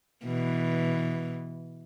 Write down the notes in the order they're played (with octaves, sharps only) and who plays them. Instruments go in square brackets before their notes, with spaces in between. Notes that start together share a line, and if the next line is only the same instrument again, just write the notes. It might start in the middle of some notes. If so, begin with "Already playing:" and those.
[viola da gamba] B2 E3